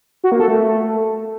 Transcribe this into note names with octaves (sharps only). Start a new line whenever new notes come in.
F#4
A#3
A4
A3